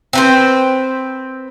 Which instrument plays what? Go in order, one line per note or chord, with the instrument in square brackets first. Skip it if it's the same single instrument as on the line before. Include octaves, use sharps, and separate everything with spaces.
[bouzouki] C4 B4 C5